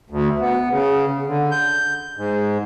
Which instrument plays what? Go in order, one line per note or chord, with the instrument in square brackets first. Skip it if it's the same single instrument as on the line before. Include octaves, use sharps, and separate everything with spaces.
[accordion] D2
B3
C#3
D3
G6
G#2